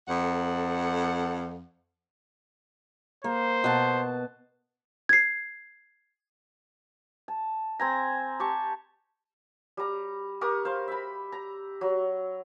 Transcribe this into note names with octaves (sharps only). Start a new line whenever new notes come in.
F2 A4 F#5
A#3 C5
B2 A5
G#6 C7
A5
C4 G#5 A#5
G4 A5 C#6
G3 A#5
G4 A#4 C#6 D#6
C5 F5
E5 B5
A#5
F#3